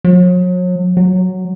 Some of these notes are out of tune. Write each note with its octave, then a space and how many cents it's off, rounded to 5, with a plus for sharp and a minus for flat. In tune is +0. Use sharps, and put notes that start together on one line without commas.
F#3 -40
F#3 +0